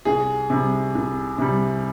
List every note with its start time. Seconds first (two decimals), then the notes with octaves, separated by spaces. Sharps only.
0.05 C2 G#4
0.50 C3 G3
0.95 C2
1.38 C3 G3